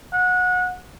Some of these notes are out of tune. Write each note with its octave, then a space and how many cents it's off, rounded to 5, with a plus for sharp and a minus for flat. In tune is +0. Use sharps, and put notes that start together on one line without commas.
F#5 -25